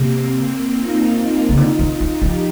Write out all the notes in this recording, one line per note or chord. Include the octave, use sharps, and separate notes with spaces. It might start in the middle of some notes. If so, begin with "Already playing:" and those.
Already playing: C3 A#3 C4
D#4 F4
C#3
D3 D#4 F4
D#3
D#4 F4
F3
F4 G4
F3